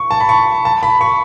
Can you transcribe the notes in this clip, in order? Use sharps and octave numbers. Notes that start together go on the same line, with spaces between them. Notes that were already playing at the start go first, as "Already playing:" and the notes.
Already playing: C#6
A5
B5
C#6
A5
B5
C#6